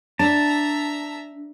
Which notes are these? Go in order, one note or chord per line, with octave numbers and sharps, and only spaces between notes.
D4 E5 A5 A#5